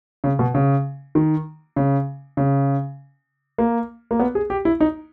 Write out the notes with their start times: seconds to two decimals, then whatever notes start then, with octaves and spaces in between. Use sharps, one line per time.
0.24 C#3
0.39 B2
0.55 C#3
1.15 D#3
1.76 C#3
2.37 C#3
3.58 A#3
4.11 A#3
4.20 B3
4.35 G#4
4.50 G4
4.65 E4
4.80 D#4